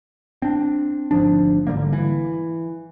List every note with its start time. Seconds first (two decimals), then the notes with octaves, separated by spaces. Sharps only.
0.42 C4 D4
1.11 G#1 D2 F3 D4
1.67 G#1 D3 G3 A#3
1.93 E3